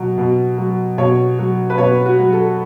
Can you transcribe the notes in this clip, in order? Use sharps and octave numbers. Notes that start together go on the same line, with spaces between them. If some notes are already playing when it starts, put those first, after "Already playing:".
Already playing: B2 F#3
B2
F#3
B2 C#5
F#3
B4
B2 C#5
F#4
F#3
A4